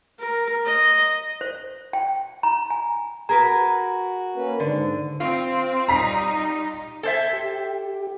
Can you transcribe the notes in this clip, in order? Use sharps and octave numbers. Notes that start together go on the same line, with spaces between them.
A#4
D#5
C5
G5
A#5
G#5
F#4 G#4 A#4 B4 A#5
A#3 C#4 B4
G#2 D3
C4 F4
G3 D#4 A#5 B6 C7
A4 C5 E5 G#5 A5
G4